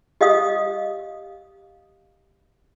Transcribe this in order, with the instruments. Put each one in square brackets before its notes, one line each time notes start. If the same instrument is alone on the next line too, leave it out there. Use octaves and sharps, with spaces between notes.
[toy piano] G4 D#5 F5 D#6